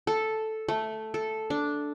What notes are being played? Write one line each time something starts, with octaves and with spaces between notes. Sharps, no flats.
A4
A3
A4
D4